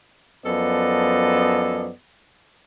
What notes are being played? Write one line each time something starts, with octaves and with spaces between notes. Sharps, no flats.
F#2 F3 B3 A4 D5 D#5